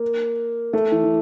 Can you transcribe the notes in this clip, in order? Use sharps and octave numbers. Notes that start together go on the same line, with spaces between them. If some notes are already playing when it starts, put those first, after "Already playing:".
Already playing: A#3
A3
E3
E3